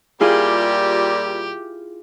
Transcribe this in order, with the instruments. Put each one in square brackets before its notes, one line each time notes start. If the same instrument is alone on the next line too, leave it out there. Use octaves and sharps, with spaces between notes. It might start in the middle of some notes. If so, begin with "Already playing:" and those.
[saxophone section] A#2 G3 [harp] E4 F4 G#4 [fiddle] G4